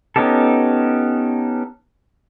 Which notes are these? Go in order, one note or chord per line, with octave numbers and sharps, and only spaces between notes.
B3 C#4 D#4 G4 A4